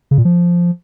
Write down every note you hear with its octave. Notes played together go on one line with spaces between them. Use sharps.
C#3
A#2
F3